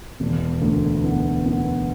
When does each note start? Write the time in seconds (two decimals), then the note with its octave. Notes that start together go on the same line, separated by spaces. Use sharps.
0.20 E1
0.61 D2
1.04 B3
1.46 B3